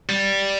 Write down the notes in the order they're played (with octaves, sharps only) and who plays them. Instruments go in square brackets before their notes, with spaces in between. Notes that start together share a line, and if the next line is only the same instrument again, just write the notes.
[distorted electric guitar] G3